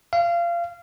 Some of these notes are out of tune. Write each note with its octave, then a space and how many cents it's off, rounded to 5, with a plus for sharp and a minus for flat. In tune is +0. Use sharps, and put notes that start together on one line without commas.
F5 -25